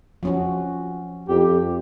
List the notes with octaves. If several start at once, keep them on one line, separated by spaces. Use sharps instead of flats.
F3 C#4 F#4
F2 G4